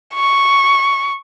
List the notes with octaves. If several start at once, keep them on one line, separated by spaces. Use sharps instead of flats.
C#6